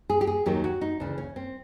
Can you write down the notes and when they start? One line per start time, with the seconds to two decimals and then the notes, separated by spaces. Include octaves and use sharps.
0.10 G#4
0.21 G4
0.27 G#4
0.46 D#2 D#3 F#3 G4
0.64 F#4
0.81 D#4
1.00 D2 C#3 E3 D4
1.18 C#4
1.36 C4